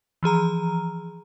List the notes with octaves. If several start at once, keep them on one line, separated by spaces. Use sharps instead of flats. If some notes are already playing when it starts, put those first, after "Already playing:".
E3 F3 G#4 A#5